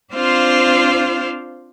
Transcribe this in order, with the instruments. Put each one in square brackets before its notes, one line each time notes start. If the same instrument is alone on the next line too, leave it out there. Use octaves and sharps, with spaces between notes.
[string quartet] C4 D4 F4 C5 F5